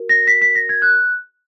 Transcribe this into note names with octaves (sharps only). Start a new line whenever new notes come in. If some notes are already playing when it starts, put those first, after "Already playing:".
Already playing: F#4 A#4
A#6
B6
B6
A#6
G#6
F#6